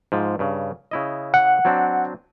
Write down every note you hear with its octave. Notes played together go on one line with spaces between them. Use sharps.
G#2 F3
G2 C#3
C#3 E4 D#5
F#5
F#3 C4 D4